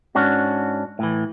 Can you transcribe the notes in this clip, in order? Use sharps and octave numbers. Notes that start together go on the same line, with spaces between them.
G#2 C#4 D4 F#4
A2 E3